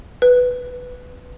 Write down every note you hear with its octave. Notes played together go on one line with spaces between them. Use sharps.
B4